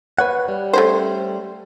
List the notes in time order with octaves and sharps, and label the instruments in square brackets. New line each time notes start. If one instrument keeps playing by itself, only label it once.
[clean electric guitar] B4 C#5 F#5
G3
[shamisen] A3 C#4 C5